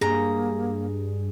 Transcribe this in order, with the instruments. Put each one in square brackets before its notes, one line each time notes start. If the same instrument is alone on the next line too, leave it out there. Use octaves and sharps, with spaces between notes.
[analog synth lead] G2 [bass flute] A#3 [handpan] G#4 [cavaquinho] A#5